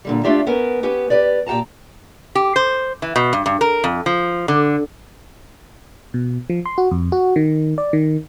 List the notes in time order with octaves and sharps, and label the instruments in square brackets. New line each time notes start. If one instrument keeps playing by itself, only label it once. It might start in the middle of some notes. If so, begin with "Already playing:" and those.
[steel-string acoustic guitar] A#2 D3 G3
A3 D4 F4 G4 D5 E5
B3 C#4 A#4
B3 C#4 G4 B4
G4 B4 D5
A#2 G4 F#5 A5 A#5
[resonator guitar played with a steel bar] G4
C5
E3
B2
G2
G2
A#4
F2
F3
D3
[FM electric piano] B2
F3
C6
F#4
F2
F#4
D#3
D5
D#3